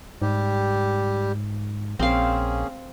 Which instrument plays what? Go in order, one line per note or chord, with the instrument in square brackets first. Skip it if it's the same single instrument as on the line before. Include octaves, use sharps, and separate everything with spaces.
[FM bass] G#2 [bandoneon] G3 G4
[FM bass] A#1 [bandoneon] A#3 C#4 G#4 [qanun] C4 F5